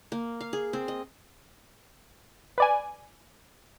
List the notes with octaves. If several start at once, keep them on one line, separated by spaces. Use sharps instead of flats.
A#3
F5
G#4
C4
D#5
B4 D5 G#5